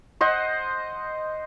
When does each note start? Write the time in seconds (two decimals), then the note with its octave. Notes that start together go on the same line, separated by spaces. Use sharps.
0.21 C5 D#5 F#5